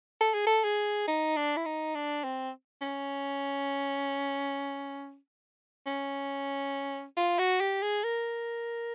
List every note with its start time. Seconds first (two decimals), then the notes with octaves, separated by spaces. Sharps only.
0.21 A4
0.34 G#4
0.47 A4
0.64 G#4
1.07 D#4
1.36 D4
1.57 E4
1.66 D#4
1.95 D4
2.24 C4
2.82 C#4
5.86 C#4
7.17 F4
7.39 F#4
7.60 G4
7.82 G#4
8.04 A#4